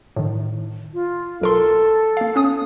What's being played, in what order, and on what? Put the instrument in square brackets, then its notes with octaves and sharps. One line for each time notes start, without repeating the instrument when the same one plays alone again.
[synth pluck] A2 D#3
[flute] F4
[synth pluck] B1 A#4 C6 [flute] A4
[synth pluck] A#3 F5
B3 C#4 D#6